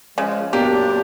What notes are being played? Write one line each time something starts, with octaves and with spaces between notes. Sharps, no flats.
C#3 F3 G#3
F#2 A#2 A#3 B3 D4 G4